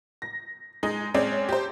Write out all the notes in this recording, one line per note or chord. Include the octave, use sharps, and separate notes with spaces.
A#6
G#3 D#4
G#3 C4 C#4 D5
G4 C5